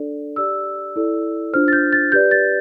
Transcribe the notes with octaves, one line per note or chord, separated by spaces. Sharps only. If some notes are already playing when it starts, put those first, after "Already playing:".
Already playing: D4 A4 D5
G4 D5 E6
E4 A4 D5
D4 F4 C5 F6
A6
G6
A6
G4 B4 D5 G6
A6